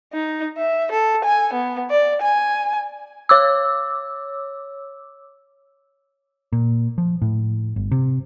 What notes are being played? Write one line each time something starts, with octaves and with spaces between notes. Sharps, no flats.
D#4
E5
A4
G#5
B3
D5
G#5
C#5 D6 E6
A#2
F3
A2
G1
C3